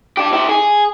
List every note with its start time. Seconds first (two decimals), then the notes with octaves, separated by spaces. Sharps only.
0.17 D4 G4
0.33 E4 G4
0.49 G#4